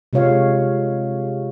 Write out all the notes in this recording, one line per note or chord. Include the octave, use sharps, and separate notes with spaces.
C3 G#3 F4 C#5 F5